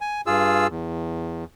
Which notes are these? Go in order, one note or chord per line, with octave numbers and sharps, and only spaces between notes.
G#5
G2 F4 G#4 E6
E2